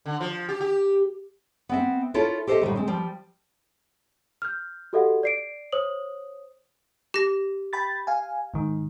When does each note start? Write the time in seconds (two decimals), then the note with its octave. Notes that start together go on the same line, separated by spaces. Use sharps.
0.06 D3
0.20 F3
0.49 G4
0.61 G4
1.69 B3 C4 E5
2.14 E4 F4 A4 A#4 C#5
2.47 G4 A4 C5 C#5 D#5 E5
2.62 A2 D3 D#3 G3
2.76 G#3 C4
2.87 F3 G3
4.42 F6 G6
4.93 F#4 G4 A4 D#5 F5 F#5
5.23 D5 C7 D7
5.72 C5 C#5 D#6 F#7
7.14 G4 A#6
7.73 G5 B5 A6
8.07 F5 G#5
8.54 G#2 D#3